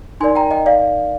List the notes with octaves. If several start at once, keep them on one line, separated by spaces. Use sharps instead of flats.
D#4 A#4 D5 G#5 C6
G5 A#5
D#5 G5
D5 F5